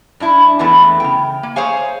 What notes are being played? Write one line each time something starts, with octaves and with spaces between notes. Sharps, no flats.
G2 D4 E4
E2 E3 G#3 A3 B3
C#3 G5
A#3
G#4 C5 C#5 F5 G#5